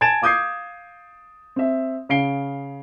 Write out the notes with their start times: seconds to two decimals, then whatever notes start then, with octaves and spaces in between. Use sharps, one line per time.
0.01 G#5 A5 G#6 A6 D7 E7
0.22 F5 D6 D#6 G6 G#6 C7
1.56 C4 E5
2.09 C#3 F5 C7 D7 G7